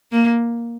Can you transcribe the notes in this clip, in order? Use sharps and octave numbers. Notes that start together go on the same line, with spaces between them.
A#3